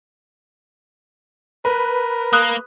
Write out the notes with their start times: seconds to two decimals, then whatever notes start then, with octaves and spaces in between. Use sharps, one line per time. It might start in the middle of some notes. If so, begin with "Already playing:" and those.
1.65 A#4 B4
2.33 A#3 D#6 F#6